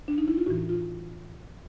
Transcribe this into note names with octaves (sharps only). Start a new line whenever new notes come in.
D4
D#4
E4
F4
A2 E3 F#4
F4